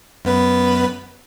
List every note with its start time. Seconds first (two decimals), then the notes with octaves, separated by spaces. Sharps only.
0.25 F#2 B3 B4